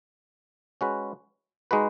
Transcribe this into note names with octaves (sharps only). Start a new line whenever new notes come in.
G#3 C#4 F#4 B4
G#3 D#4 F#4 B4